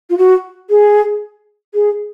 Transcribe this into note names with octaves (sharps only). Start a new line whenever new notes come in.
F4
F#4
G#4
G#4